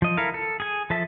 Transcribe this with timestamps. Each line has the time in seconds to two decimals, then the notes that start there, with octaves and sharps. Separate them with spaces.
0.02 F3 D#5
0.17 E4 A4 A#4 F5
0.34 A4
0.60 G#4 G#5
0.90 F3 A4 E5 A5